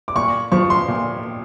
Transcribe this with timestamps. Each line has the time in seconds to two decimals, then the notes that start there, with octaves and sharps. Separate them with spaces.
0.08 D6
0.15 A#2 C#6
0.52 F3 C#6
0.70 C6
0.88 A#2